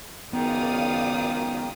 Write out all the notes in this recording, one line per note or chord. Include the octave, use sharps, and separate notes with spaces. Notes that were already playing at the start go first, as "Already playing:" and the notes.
G#1 C#2 F#2 D#3 B3 D5 F5 D#6